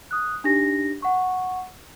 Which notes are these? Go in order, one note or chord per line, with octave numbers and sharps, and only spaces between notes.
D#6 F#6
D4 D#4 G4 A#6
F#5 C#6